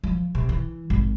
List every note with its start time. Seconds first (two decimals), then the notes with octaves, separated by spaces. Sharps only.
0.04 F3
0.35 C3
0.49 E3
0.90 G#1